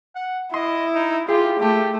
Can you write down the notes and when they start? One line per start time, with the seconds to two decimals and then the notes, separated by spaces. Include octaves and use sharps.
0.15 F#5
0.54 E4 D#5 C6
0.95 D#4
1.29 F4 G4 G#4
1.60 A3 G4